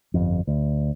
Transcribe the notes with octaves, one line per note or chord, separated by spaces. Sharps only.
G1 F2
D2